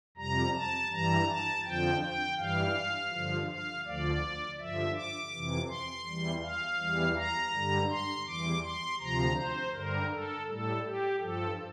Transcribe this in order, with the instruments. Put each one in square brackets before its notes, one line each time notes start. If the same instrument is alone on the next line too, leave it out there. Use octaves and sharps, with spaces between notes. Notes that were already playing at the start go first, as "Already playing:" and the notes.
[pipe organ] F2 C3 G3 A#5
A5
G2 E3 G3 A#5
A5
F2 D3 F3 G5
G5
G2 E3 G3 F5
G2 D3 F3
F5
D2 D3 F3 D5
G2 D3 F3 E5
D6
F2 C3 E3
C6
E2 E3 G3
F5
E2 E3 G3
A#5
G2 D3 G3
C6
E2 E3 G3 D6
C6
D2 C3 F3 A#5
C5
G2 D3 G3 A#4
A4
A2 G3 A4
G4
G2 F3 A4